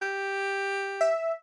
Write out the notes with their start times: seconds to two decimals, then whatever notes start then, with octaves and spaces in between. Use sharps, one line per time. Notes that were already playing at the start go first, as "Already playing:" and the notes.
0.02 G4
1.01 E5